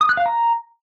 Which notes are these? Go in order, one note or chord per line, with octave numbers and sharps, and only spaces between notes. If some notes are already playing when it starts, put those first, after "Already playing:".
D#6
F#6
F5
A#5